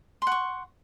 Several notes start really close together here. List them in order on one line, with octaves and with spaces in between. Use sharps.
C6 F#5 C#6